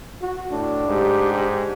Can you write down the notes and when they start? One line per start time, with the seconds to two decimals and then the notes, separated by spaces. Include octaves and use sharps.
0.22 F#4
0.51 A2 D4
0.88 G#2 G4